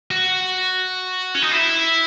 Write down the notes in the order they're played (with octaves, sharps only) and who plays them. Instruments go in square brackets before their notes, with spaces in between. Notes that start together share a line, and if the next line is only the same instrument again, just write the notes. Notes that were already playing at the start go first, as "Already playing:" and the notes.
[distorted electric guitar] F#4
C#4
D#4
E4